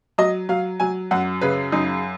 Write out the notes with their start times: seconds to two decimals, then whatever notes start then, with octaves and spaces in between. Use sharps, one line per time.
0.18 F#3 D#5
0.49 F#3 F5
0.80 F#3 G#5
1.11 F#2 F#5
1.41 C#3 B4
1.72 F#2 D#4